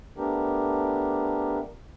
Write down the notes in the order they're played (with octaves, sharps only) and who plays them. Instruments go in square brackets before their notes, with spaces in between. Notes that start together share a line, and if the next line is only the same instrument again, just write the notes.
[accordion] A3 B3 D4 G4 A#4